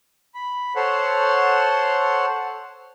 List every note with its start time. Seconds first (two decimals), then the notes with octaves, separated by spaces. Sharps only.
0.34 B5
0.76 A4 C5 C#5 F#5 C6